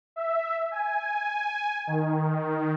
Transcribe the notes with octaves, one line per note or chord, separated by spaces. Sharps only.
E5
G#5
D#3